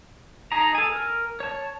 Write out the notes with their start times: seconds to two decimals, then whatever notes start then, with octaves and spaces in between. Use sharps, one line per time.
0.52 D#4 G#4 A5 A#5
0.75 A4 G#5
0.92 A#4
1.40 C#5 A5